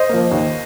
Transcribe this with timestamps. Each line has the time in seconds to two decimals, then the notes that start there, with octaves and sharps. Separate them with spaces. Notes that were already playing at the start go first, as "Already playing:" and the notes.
Already playing: C5 D#5
0.09 F3 A#3
0.31 D#2